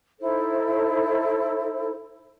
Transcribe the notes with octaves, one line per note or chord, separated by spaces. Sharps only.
D#4 E4 A4 C5